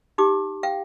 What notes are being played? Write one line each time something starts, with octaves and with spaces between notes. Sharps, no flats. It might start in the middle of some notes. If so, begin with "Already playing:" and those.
D#4 G4 D6
F5 G5